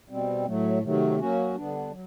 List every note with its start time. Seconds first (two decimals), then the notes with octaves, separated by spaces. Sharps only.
0.09 B2 G3 C4
0.46 A2 F#3 A3
0.83 C3 D#3 F#3 A3
1.19 F#3 A#3 C#4 F#4
1.55 D3 G3 B3 D4
1.91 F#3